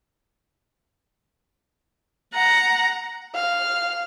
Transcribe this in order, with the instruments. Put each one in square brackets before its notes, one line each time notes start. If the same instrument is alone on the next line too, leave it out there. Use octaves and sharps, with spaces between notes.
[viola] F#5 A#5
[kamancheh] F5